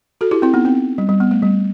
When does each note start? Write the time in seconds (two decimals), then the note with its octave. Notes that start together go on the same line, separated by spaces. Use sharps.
0.21 F#4 A4
0.31 E4 G4
0.42 C4 E4
0.53 B3 D#4
0.65 C4
0.98 G3
1.09 G3
1.20 B3
1.31 A3
1.42 G3